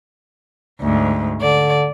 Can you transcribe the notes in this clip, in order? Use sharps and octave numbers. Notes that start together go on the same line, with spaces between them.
D2 G#2
D3 D5